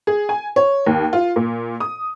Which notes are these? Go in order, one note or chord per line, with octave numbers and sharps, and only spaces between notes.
G#4
G#5
C#5
D#2
F4
A#2
D#6